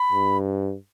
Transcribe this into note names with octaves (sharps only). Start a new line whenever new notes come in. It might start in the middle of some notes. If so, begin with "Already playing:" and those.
Already playing: B5
G2